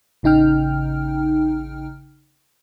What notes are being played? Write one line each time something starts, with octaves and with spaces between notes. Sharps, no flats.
A1 C#3 D#4 G5 F6